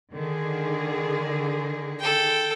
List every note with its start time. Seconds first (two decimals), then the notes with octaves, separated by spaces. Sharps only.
0.13 D3 D#3 G#4
2.00 A4 G5